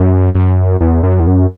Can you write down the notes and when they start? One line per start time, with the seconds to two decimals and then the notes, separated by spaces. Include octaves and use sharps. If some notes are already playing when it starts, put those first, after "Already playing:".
Already playing: F#2
0.35 F#2
0.81 E2
1.03 F#2
1.20 E2
1.27 F#2